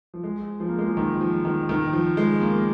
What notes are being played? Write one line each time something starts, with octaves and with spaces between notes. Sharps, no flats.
F3
G#3
F3
A#3
G#3
F3
D#3
F3
D#3
D#3
F3
G#3
A#3